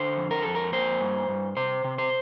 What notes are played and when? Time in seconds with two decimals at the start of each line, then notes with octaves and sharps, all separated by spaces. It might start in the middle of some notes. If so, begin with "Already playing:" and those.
Already playing: D3 C5
0.17 F2
0.31 A#4
0.43 F2 A4
0.55 A#4
0.73 A#3 C5
1.01 G2
1.29 G2
1.57 C3 C5
1.84 C3
1.98 C5